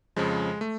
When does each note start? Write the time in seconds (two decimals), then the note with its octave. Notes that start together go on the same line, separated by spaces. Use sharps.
0.16 F2 C#3 F3 G#3
0.61 A3